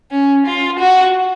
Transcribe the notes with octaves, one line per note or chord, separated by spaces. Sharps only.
C#4
F4
F#4